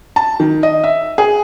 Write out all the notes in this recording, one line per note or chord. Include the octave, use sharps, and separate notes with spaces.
A5
D#3
D#5
E5
G#4